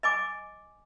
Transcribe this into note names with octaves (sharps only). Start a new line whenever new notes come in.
D#5 G#5 D6